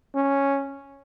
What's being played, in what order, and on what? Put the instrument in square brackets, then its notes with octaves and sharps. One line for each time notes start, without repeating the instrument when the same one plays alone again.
[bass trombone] C#4